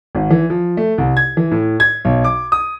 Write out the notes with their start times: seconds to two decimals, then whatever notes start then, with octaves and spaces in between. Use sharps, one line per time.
0.15 G#1
0.30 E3
0.50 F3
0.77 A3
0.98 C2
1.17 G#6
1.37 E3
1.51 A2
1.80 G#6
2.05 B1
2.25 D6
2.52 D#6